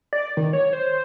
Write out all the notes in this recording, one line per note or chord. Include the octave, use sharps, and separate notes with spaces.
D5
D#3
C#5
C5